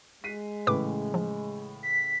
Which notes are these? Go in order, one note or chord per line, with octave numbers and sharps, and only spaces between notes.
G#3 B6 C7 D#7
A2 C#3 E3 B4 D6
F3
B6